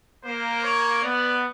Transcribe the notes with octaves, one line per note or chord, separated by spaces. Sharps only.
A#3 C5
C#5
B3 D5